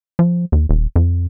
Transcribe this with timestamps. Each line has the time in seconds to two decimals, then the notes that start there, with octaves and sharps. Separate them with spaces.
0.19 F3
0.52 D#2
0.69 D#1
0.96 F2